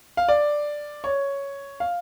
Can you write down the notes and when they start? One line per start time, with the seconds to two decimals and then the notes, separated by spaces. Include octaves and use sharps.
0.17 F5
0.28 D5
1.04 C#5
1.80 F5